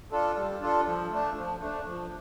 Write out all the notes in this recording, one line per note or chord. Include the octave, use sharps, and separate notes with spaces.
D4 F4 A4
G3
D4 F4 A4
F3
A3 D4
F3
A3 D4
F3